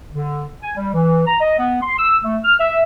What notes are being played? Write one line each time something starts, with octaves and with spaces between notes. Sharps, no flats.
D3
G#5
G3
E3
A#5
D#5
B3
C6
E6
A3
F6
E5